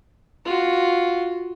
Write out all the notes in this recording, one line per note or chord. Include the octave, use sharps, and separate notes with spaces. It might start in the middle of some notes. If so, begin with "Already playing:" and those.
F4 F#4